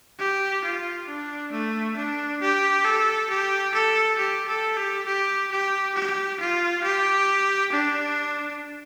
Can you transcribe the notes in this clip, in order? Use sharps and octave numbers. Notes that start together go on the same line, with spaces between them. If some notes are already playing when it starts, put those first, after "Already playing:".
G4
F4
D4
A3
D4
G4
A4
G4
A4
G4
A4
G4
G4
G4
G4
F4
G4
D4